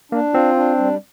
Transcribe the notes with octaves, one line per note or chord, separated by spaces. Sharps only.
A#3 D4
C4 F4
D4
G3